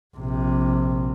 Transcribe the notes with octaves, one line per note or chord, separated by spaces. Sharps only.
A#1 C3